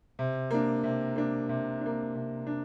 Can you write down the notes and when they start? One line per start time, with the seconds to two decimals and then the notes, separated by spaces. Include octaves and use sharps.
0.19 C3
0.51 A#3 D4
0.84 C3
1.16 A#3 D4
1.49 C3
1.81 A#3 D4
2.15 C3
2.47 D4